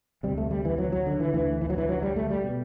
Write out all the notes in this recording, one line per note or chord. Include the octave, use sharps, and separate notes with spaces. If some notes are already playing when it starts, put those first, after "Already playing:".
D2 C3 G3
A3
G3
E3
F#3
F#3
D3
E3
D2 D3 E3
E3
F#3
E3
F#3
G3
A3
G3
B2